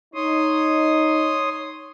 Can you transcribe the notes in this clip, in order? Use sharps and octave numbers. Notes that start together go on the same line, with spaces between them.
D#4 C#5 C6 D#6